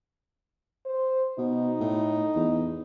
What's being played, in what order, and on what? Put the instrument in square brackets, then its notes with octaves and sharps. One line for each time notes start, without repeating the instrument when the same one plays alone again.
[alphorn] C5
[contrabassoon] B2 [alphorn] D#4
[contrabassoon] A2
E2